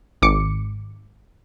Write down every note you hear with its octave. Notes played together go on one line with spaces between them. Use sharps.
G#1 D6 C#7